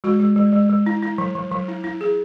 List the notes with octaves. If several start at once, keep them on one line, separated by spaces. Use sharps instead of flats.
G#3 F#4
G#3
G#3
G#3
G#3
E4
E4
F#3
F#3
F#3
E4
E4
E4 G#4